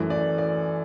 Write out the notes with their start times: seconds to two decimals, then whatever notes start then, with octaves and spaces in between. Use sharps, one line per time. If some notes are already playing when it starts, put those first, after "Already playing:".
Already playing: F#2 E3 A3
0.10 D5
0.38 D5